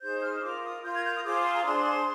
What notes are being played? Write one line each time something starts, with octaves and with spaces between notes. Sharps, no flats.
D#4 G#4 C5 G6
F6
F4 A#4 D6
D#6
F4 A#4 G6
G#6
G6
D#6
F4 G#4 C5 D6
C6
A#5
D4 G#4 C5 C6